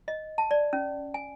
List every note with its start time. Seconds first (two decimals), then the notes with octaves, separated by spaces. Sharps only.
0.08 D#5
0.38 A5
0.51 D5
0.73 C#4
1.14 G#5